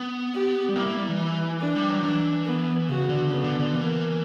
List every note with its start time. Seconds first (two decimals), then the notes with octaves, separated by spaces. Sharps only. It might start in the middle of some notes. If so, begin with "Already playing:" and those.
Already playing: B3
0.34 G4
0.69 G3
0.76 A#3 E4
0.86 A#3
0.97 G3
1.08 E3
1.18 E4
1.61 D4
1.75 G3
1.89 F#3
2.03 E3 D4
2.46 B3
2.88 C#3 F#4
3.09 D3
3.30 C#3 B3
3.44 D3
3.59 D3
3.73 E3 A#3